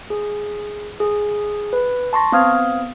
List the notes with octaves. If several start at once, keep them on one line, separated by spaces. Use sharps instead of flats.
G#4
G#4
B4
A5 C6 C#6 A#6
B3 C4 F5 D#6 F6 G#6